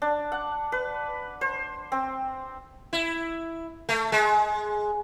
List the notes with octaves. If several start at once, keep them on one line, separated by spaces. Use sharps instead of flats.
D4
F#5
B4
C5
C4
E4
A3
G#3